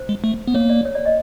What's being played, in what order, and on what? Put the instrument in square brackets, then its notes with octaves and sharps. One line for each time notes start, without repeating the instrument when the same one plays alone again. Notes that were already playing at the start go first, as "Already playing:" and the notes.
Already playing: [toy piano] C5
[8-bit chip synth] G#3
A3
B3
[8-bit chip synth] A#3 [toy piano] C#5
[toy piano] D5
C#5
D5
D#5